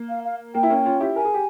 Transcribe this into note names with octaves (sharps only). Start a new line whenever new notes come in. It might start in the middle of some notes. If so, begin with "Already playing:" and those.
Already playing: A#3
F5
F5
A#3 G5
E4
A#3 C#4
C#4 F4
E4 G4
A#4 G#5
G#4
G4